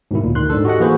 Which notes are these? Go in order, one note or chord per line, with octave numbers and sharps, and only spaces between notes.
G#2 B2 D#3 E4
D2 A#2
D2 D#3 C6 F#6
G#2 D4 A4
F#4 G4 A4 D#5 F#5
E3 A#3 F#4 G#4 B4 C5